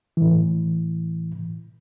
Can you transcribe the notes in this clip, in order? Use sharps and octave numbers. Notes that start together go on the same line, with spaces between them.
A2 E3